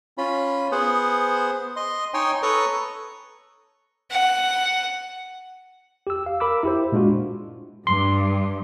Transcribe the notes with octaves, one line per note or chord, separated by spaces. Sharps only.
C#4 F4 B5
B3 G#4 C5 F#5
D#5 C6
D#4 C#5 G5 G#5 C6
A4 B4 C#5 A#5 C#6 D#6
F#5
G4 E6
F5
A#4 B5 D6 E6
E4 G4 C5
A#2 G#3 D4 F4 F#4
G2 C6